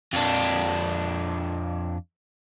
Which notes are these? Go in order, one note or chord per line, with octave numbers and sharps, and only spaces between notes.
F2 D4